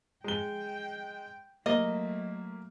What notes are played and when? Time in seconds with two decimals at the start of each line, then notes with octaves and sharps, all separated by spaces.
0.24 G#3 G5 G7
1.66 F#3 A3 A#3 D#5